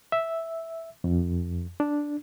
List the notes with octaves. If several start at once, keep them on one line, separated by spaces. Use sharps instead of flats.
E5
F2
D4